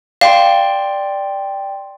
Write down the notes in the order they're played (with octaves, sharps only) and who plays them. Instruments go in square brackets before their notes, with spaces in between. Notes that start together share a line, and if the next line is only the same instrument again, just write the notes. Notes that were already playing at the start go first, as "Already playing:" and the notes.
[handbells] D5 G5 C6 [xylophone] F5